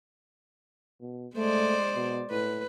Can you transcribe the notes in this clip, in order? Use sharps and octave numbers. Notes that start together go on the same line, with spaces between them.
B2
G#3 A3 C5 D5
B2
A2 B4